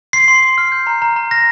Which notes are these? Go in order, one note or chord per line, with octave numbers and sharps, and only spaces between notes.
C6 C7
C6
C6
F6
G6
A#5
A#5
A#5
F6 A#6